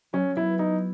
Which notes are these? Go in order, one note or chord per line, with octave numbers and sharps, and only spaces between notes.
F#3 C#4
B3 E4
D#4 E4